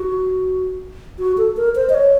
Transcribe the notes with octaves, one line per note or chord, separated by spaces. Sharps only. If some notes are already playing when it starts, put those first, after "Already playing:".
Already playing: F#4
F#4
A4
A#4
C5
D#5
C#5